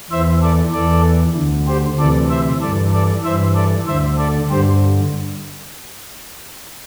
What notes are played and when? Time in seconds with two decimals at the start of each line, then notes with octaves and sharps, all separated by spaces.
0.10 E2 E3 C5 E5
0.42 A4 D5
0.73 E2 E3 A4 D5
1.36 D2 D3
1.67 G4 C5
1.99 D2 C3 E3 A4 D5
2.30 C5 E5
2.62 G2 E3 A4 D5
2.94 A4 D5
3.24 G2 E3 C5 E5
3.55 A4 D5
3.87 D2 C5 E5
3.92 D3
4.18 A4 D5
4.50 G2 D3 G4 C5